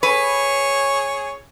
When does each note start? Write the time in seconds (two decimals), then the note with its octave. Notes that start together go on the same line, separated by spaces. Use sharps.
0.03 G#4 B4 C#5